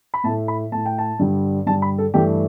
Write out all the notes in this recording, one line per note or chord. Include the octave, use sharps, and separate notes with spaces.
B5
A2 A3 A5
B5
A2 A3 A5
G5
A5
G2 D3 G3
G2 D3 G3 A5
B5
A4
G2 E3 A3 G4